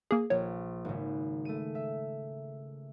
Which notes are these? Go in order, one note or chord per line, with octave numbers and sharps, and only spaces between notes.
A#3 G#4
A#1 C#5
G#1 C#3
A3 D#7
E5